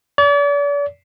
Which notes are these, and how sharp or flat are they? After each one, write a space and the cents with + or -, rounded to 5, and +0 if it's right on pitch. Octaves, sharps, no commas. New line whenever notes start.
D5 -40